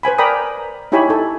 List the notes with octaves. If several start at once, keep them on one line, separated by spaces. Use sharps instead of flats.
B4 C5 G#5 B5
A#4 D5 G5 A#5 B5 D#6
D#4 E4 G4 C#5 G#5 B5
D#4 A4